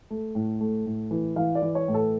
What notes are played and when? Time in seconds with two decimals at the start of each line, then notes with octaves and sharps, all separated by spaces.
0.10 A3
0.35 A2
0.61 A3
0.86 A2
1.11 E3
1.36 E3 F5
1.55 D5
1.62 E3
1.75 C#5
1.88 A2
1.94 A4